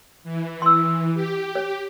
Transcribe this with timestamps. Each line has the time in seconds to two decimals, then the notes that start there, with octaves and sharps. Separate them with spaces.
0.24 E3
0.62 C6 E6
1.14 G4
1.55 C#5